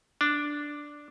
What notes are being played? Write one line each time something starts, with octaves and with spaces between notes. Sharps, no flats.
D4